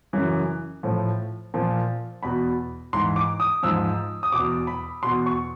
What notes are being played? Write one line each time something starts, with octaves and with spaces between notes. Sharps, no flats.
F#2 C#3 E3
A2 F3
A#2 F3
E2 B2 B5
G#2 E3 C6
D6
D#6
G#2 F3 E6
D#6
E2 B2 D6
B5
E2 B2 C6
C#6